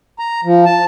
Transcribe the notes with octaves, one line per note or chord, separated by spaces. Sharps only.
A#5
F3
A5